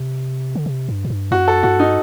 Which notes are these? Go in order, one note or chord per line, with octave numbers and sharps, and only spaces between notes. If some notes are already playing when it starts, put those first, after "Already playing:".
Already playing: C3
D3
C3
G2
A2
G2
F#2 F#4
A4
G2 F#4
D#4